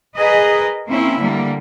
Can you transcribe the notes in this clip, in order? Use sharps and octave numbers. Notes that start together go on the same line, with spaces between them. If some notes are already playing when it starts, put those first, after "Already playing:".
G#4 A#4 B4 D#5
A#3 C4 C#4 E4
D3 G3 A#3